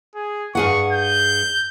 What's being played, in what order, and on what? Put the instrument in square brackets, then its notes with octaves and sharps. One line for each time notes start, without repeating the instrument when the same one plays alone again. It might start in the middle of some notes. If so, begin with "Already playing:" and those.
[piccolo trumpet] G#4
[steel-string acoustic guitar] G2 G#4 F#5 [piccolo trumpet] C#6
[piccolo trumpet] G6